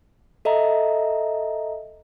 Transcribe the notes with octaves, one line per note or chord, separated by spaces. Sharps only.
A4 D#5 E5 A#5